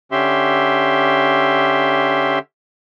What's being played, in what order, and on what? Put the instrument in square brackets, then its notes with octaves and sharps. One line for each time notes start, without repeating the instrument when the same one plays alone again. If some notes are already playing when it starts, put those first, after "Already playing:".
[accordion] D3 C#4 G4 E5 C6